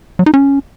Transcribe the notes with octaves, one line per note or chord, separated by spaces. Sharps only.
F#3
D#4
C#4